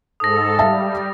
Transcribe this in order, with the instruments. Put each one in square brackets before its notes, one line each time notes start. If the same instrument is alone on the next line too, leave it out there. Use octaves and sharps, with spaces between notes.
[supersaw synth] G#2 A4 [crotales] D#6 A#6
[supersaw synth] G3 [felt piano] E5 F5 A5